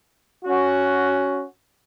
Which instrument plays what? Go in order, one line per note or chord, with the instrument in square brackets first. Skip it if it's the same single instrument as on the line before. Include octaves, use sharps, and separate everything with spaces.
[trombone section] C#4 F#4